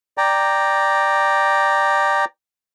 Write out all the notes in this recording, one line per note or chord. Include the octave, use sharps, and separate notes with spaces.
D5 G5 A#5